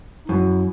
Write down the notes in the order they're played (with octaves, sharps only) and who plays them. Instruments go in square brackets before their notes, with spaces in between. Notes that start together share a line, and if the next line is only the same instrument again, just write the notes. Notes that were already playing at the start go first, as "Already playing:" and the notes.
[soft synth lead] D#4
[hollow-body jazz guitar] F#2 [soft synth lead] E4